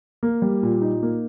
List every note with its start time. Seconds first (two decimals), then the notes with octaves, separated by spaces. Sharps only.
0.23 A#3
0.42 G3
0.63 A#2
0.82 D#4
1.03 A#3